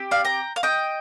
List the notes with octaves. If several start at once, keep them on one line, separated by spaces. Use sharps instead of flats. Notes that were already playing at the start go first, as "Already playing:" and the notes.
Already playing: C4 G4
D5 F5
G5 A#5
F5
D#5 G5